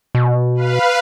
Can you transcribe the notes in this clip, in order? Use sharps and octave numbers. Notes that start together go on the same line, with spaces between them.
B2
B4 F5